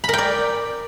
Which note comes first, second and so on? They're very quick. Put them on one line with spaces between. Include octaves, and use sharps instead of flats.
B5 A#4 G5 D5